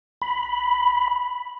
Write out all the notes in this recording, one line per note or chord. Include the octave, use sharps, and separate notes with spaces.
B5